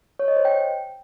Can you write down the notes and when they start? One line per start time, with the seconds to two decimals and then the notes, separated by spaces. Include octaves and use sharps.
0.19 C#5
0.28 D#5
0.36 C5
0.45 G5